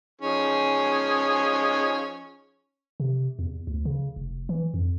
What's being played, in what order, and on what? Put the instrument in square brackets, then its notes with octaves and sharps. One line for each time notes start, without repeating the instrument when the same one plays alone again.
[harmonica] F3 D#4 G#4 [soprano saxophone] C#4
[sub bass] C3
E2
D2
C#3
F1
E3
F2